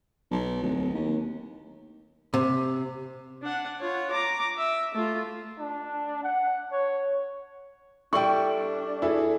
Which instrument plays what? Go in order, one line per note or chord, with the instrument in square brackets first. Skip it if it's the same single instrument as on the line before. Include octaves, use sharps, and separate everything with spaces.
[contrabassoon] B1
D1
D#2
[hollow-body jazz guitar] C3
[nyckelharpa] D4 F#5
F4 C#5
A#5 D6
E5
A3 F4
[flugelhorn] D4
F#5
C#5
[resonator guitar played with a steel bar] G3 E4 [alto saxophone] D4 [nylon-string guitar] A4 G5 [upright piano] C#6 F#7
[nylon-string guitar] E3 [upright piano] E4 G#4 A4